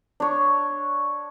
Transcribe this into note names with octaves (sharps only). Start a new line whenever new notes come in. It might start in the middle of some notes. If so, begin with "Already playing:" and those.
D4 C#5